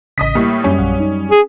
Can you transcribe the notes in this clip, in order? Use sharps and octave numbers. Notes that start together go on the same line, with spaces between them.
A1 C#3 D#5 D#6 B6
A2 G3 A#3
F#2 G3 C#4
A#1 F5 F#5
D#4
G#4